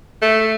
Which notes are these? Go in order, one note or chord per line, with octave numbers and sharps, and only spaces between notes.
A3